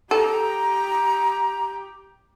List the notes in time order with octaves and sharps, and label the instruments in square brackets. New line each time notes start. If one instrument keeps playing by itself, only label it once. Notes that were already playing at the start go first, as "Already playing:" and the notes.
[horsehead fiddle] G4 [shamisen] A4 [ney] A#5